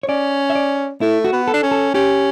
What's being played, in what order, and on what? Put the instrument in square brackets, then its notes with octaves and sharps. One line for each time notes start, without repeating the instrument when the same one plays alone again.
[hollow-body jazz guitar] C#5
[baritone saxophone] C#4 [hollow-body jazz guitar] D5
[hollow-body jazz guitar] E5
D5
[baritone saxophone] A3 [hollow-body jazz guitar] E4
[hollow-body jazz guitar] F#4
[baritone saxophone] B3
[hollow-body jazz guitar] A4
[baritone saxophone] D4
C#4
[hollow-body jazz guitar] A4
[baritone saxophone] C#4 [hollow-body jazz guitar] G4